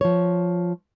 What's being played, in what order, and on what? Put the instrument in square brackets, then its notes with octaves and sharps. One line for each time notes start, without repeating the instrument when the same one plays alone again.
[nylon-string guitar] F3 C#5